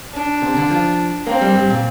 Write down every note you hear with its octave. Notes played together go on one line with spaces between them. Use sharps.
D4
C3
D3
F3
A#3 C4
G3
G2
A#2